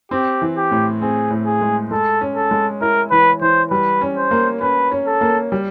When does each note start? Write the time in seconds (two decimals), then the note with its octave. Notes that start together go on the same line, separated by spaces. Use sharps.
0.11 C4 G4
0.42 E3
0.57 G4
0.71 A2
1.01 C4 G#4
1.30 A2
1.46 G#4
1.61 G#3
1.91 G#3 A4
2.21 C#4
2.36 A4
2.51 G#3
2.81 E4 A#4
3.11 E3 B4
3.41 E3 C5
3.71 G3 B4
4.01 C#4
4.17 C5
4.31 A#3
4.61 C#4 B4
4.91 C#4
5.07 A4
5.21 A#3
5.52 G3